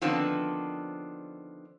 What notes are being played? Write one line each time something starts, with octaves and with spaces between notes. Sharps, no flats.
D3 D#3 F3 B3 C4 D4